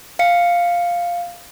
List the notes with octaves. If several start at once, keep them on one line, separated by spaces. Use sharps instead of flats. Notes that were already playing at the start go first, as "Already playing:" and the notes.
F5 C#7